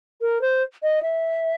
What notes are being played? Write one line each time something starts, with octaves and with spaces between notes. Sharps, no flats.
A#4
C5
D#5
E5